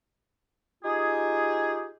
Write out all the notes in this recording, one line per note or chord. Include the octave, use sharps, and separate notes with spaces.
D#4 F4 G4 G#4